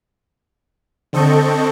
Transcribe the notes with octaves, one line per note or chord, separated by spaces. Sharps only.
D3 C4 A4 D#5 C#6 G6